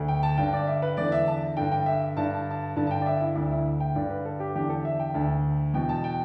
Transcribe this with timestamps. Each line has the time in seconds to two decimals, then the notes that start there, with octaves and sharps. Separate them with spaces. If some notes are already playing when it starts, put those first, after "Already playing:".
Already playing: D2 D3
0.08 G5
0.23 A5
0.38 G2 D3 G5
0.53 D5
0.67 E5
0.82 B4
0.97 E2 D3 D5
1.12 E5
1.28 A5
1.57 G2 D3 G5
1.72 G5
1.86 E5
2.16 G2 D3 A5
2.34 A5
2.51 A5
2.76 G2 D3 A5
2.87 A5
2.91 G5
3.01 D5
3.06 E5
3.21 E4
3.35 D2 D3 D4
3.51 E4
3.80 G5
3.95 G2 D3 D5
4.10 B4
4.25 A4
4.40 G4
4.55 E2 D3 G4
4.69 A4
4.85 E5
4.99 G5
5.14 D2 D3 A5
5.74 E2 B2 G5
5.89 A5
6.04 G5